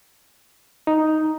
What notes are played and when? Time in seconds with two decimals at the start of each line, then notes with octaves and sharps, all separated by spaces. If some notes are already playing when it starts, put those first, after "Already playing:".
0.87 D#4